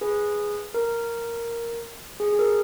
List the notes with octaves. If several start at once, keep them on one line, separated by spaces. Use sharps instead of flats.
G#4 B4
A#4
G#4
G#4
A#4